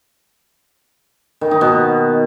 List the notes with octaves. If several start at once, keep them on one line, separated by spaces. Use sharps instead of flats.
D#3
D#4
B2